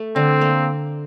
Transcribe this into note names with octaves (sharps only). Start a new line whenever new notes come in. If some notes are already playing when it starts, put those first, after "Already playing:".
Already playing: A3 A4
D3 C4
A#3